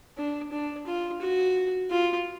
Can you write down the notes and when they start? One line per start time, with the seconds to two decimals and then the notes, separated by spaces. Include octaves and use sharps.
0.18 D4
0.52 D4
0.87 F4
1.21 F#4
1.91 F4